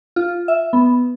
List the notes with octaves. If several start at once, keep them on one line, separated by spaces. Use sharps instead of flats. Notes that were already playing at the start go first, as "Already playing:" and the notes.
F4
E5
B3